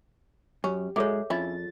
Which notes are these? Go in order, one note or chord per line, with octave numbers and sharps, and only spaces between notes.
F#2 C#4 G4
G#2 F#3 G#3 G#4 A4 C#5 E5
F2 C#4 E4 F4 A6